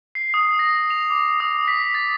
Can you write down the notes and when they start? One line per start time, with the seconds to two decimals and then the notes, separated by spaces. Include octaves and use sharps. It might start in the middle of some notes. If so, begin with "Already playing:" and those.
0.15 C7
0.34 D#6
0.59 A#6
0.90 F7
1.10 D6
1.40 D#6
1.68 B6
1.94 A6